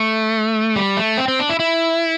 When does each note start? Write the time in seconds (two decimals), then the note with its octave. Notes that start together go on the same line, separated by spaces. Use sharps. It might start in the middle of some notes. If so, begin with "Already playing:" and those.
Already playing: A3
0.76 G3
0.97 A3
1.18 C4
1.28 C4
1.39 D4
1.50 E4
1.60 E4